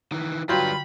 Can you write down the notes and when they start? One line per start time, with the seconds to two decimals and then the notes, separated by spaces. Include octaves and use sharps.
0.12 D#3 E3
0.49 D3 F#3 G3 F4 B4 G5 B5 G6